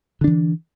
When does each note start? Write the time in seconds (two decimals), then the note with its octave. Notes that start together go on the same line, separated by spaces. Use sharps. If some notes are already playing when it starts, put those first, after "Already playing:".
0.21 D3
0.24 D4
0.27 E3